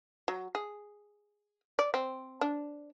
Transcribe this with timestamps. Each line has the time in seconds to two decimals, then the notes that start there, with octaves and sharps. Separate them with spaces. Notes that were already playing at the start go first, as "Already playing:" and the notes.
0.28 F#3
0.55 G#4
1.79 D5
1.94 C4
2.41 D4